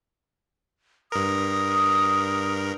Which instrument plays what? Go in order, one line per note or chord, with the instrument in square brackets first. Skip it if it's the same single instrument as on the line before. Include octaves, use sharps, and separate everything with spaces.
[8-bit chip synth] G2 A#4 [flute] D#6